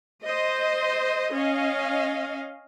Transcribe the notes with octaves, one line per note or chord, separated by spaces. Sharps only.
C5 D#5
C#4 D#5 F5